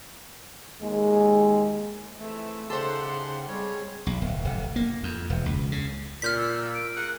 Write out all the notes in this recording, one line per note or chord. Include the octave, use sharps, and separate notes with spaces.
D#2 D#3 G#3
E3 A3 C4 E5
C#3 D#4 G4 A4 C5 F#5 C6
G3 G#3 C4 G#4 C#5
B1
D1
F1
A#3
F2
E1
C#2
C#3
A#2 F6 G6 B6
E6
D7
G#4 A#4 F#5 F#6